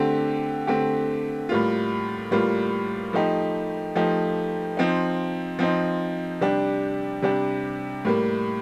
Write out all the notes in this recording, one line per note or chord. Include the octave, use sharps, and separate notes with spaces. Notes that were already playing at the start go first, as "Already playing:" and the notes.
Already playing: D3 A3 C4 G4
D3 A3 C4 G4
A2 G3 A#3 F4
A2 G3 A#3 F4
F3 A3 D#4 G4
F3 A3 D#4 G4
F3 C4 D#4
F3 C4 D#4
C3 G3 D4 G4
C3 G3 D4 G4
A2 G3 A#3